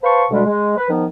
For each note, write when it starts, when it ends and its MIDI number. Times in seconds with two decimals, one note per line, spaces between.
0.04 0.26 71
0.04 0.26 72
0.04 0.26 77
0.04 0.26 81
0.04 0.26 85
0.31 0.43 38
0.31 0.43 47
0.31 0.43 55
0.31 0.43 56
0.47 0.77 56
0.77 0.88 71
0.90 1.05 51
0.90 1.05 53
0.90 1.05 59
0.90 1.05 63